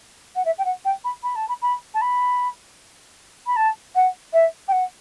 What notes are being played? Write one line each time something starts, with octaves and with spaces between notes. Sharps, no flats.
F#5
E5
G5
F#5
G5
B5
B5
A5
B5
B5
A5
B5
B5
A5
F#5
E5
G5
F#5